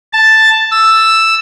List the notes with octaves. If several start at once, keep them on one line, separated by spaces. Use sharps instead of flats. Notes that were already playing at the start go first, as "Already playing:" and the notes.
A5
E6